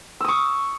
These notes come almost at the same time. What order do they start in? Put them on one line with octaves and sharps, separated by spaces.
E6 D#6 C#6